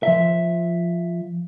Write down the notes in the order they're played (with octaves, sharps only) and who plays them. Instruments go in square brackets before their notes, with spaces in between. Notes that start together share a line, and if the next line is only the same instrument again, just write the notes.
[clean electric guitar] F3 E5